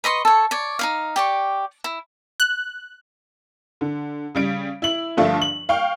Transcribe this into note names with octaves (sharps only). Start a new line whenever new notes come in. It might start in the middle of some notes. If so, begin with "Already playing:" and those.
B4 D#5 C6 C#6
A4 C#5
C#5 D5
D#4 E4 F5
G4 D5 C#6
E4
F#6
D3
C#3 G3 D7
E4 F#7
G2 D3 F3 A3 D4 F4
F#7
F5 G5 C#6